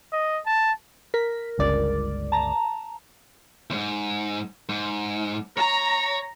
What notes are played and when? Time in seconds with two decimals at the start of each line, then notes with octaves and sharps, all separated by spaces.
0.13 D#5
0.46 A5
1.14 A#4 B6
1.58 G1 C#2 D5
2.32 A5 A#5
3.70 E2 G#2
4.69 G#2
5.57 C#5 A#5